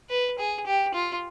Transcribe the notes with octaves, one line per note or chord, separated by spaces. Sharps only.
B4
G#4
G4
F4